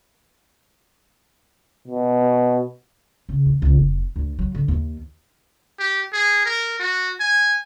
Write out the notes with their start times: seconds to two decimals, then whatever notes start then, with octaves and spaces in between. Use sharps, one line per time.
1.87 B2
3.29 C#3
3.46 E2
3.62 C#2
3.74 F1
4.16 D2
4.39 F#3
4.55 D3
4.68 D#2
5.79 G4
6.13 G#4
6.45 A#4
6.79 F#4
7.20 G#5